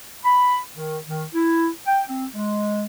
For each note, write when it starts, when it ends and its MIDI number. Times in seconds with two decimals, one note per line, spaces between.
0.24 0.57 83
0.76 0.98 51
1.07 1.23 51
1.33 1.69 64
1.86 2.02 79
2.08 2.25 60
2.35 2.85 56